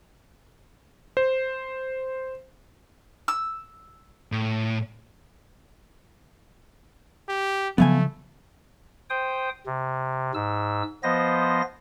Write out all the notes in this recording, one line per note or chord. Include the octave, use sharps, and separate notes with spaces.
C5
E6
A2
G4
C#3 F3 F#3 A3 B3 F5 G#5
C5 G5 D#6
C3
G#2 E6
F3 B3 C5 D#5 A#6